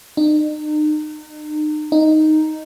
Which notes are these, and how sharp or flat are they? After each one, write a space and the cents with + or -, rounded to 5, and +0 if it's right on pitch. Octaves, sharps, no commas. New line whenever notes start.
D#4 -40
D#4 +0